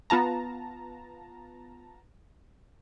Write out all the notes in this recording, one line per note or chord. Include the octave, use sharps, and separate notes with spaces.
B3 F4 A5 A#5